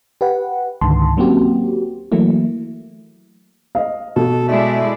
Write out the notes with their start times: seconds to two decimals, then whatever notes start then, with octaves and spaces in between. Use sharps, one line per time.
0.21 G4 B4 F#5
0.81 C#2 G#2 D3 D#3 A5 C6
1.17 F#3 A#3 C4 C#4 F#4 G4
2.12 E3 F#3 A3 A#3 E4
3.75 D#5 F5
4.16 B2 A4
4.48 G#3 A3 E4 D5